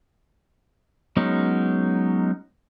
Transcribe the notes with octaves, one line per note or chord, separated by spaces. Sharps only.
F#3 G#3 B3 C#4 D#4